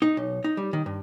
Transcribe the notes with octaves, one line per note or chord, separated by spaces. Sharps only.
D#4
B1
D#4
G3
D#3
G2